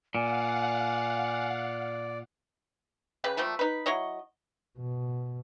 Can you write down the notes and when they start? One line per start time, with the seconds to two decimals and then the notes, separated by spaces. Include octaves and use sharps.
0.15 A#2 D5 F5 F#5 G#5
3.24 C#3 G4 B4 B5
3.37 F3 G3 A3 A#3
3.59 D#4 B4
3.86 F#3 E4 C#5 D#5
4.77 B2